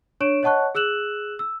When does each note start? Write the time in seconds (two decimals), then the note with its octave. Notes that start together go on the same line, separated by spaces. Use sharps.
0.20 D4 C#5 C#6 D7 E7
0.43 C#5 D#5 F#5 A5 C#6 F#6
0.75 G#4 E6 F#6 E7 F#7
1.39 E6